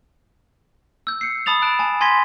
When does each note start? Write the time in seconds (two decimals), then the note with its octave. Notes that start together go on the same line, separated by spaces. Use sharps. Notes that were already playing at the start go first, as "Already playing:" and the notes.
1.07 E6 G6
1.21 C7 C#7
1.46 A5 B5 D#6 A6 F7
1.62 A5 F#6 A6 D7 E7
1.79 G#5 A5
2.01 G#5 C6 G#6 A#6 B6 G7